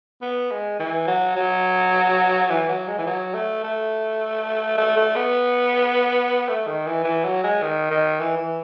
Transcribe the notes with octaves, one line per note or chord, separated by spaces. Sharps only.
B3
G#3
E3
F#3
F#3
E3
F#3
G#3
E3
F#3
A3
A3
A3
A3
B3
A3
D#3
E3
E3
F#3
G#3
D#3
D#3
E3
E3